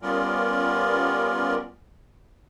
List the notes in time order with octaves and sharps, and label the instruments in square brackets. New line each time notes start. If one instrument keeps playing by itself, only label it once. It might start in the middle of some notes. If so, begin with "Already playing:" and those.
[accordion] G3 B3 C#4 F4 A#4 D5